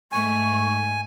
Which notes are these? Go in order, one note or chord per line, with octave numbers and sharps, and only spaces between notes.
G#2 A3 G#5 C#6